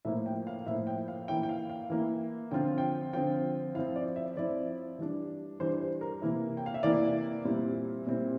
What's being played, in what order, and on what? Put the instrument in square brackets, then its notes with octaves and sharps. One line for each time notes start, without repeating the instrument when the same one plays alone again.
[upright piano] A2 F3 A#3 E4 E5
G5
F5
A2 F3 A#3 E4 E5
G5
F5
E3 A#3 E4 G5
G5
F5
F5
E3 A#3 E4
D3 F3 C4 F4 G5
G5
D3 F3 C4 F4 G5
F3 C4 E4 F5
D5
E5
F3 C4 E4 D5
E3 G3 D4
E3 G3 D4 C5
C5
A#4
C3 E3 A#3 E4
G5
F5
E5
C3 E3 A#3 E4 D5
A#2 G3 C4 E4
A#2 G3 C4 E4